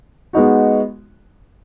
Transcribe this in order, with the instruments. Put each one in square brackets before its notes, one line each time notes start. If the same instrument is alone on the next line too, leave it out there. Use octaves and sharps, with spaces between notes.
[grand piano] G#3 B3 D#4 F#4